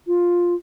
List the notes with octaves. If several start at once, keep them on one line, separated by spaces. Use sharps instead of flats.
F4